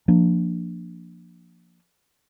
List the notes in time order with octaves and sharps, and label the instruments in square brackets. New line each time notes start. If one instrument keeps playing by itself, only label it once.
[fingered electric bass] F3 A#3 D4